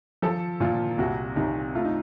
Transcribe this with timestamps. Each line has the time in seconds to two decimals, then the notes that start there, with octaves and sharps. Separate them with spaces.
0.22 F3 A4
0.60 A#2 F4
0.98 C2 F#4
1.36 C2 D#4
1.75 A3 F4
1.85 D#4